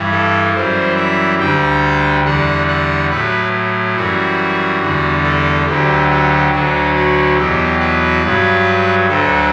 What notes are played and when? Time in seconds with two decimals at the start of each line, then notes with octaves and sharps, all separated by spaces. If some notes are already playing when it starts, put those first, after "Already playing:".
Already playing: G2 E3 G3
0.11 A4
0.54 F#2 E3 G3 C5
0.96 E5
1.40 D2 D3 G3 G5
2.25 E2 D3 G3 F#5
2.68 F#5
3.10 A2 F#3 B4
3.96 F#2 E3 G3 F#4
4.81 E2 D3 G3
5.24 A4
5.66 D2 D3 F#3 G4
6.10 G4
6.52 D2 D3 F#3 F#4
6.95 F#4
7.37 E2 B2 F#3 G4
7.80 B4
8.23 G2 F#3
9.08 D2 D3 F#3 A4